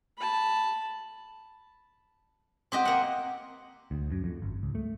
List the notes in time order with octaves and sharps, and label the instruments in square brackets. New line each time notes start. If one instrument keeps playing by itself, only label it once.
[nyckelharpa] A5 B5
[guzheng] C4 G4 D#5 [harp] F#5 D6
[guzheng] A#3 F#5 [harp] D#6
[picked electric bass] D2
F#2
F2
G#1
C#2
A3